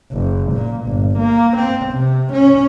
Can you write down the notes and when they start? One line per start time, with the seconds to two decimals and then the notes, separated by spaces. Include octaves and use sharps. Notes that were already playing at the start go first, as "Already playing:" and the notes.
0.12 F#1
0.53 A#2
0.87 G1
1.18 A#3
1.57 C4
1.93 C3
2.32 C#4